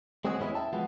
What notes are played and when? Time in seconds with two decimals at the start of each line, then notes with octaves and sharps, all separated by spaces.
0.25 G#3 C4 C#4 F#4 G#4
0.38 E2 A2 E3 G#3 C#4 E4
0.55 E5 G5 A5
0.73 F3 G#3 B3 F4 F#4